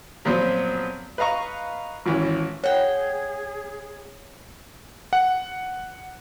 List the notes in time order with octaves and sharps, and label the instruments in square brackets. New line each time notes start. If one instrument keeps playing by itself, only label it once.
[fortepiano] A#2 F3 F#3 B3 C4
B4 D#5 F5 A#5 C#6
G#1 E3 C#4
[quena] G#4 [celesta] C#5 [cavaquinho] F#5 G5
[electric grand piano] F#5